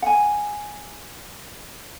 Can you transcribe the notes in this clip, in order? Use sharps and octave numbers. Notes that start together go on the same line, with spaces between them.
F#5 G#5